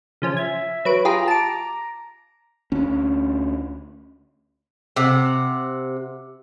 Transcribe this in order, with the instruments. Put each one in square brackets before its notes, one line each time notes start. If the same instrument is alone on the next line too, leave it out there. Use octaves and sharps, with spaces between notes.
[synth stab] C#3 F3 C#4
[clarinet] E5 [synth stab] G#6
[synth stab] F#3 B4 D7
[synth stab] F4 G4 G#4 [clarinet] A#5
[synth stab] A5 D6
[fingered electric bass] D2 C#4
[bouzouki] C3 F#5